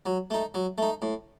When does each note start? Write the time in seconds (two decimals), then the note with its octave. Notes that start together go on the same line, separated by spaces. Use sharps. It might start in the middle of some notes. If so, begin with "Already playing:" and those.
0.06 F#3
0.30 A3 D#4
0.54 F#3
0.78 A3 D#4
1.02 A2